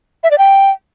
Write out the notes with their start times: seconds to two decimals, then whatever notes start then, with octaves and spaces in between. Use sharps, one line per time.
0.24 E5
0.31 D5
0.38 G5